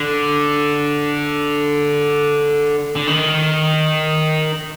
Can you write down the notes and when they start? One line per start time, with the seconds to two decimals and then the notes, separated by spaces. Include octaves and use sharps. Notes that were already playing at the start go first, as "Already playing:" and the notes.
Already playing: D3
2.96 D3
3.07 D#3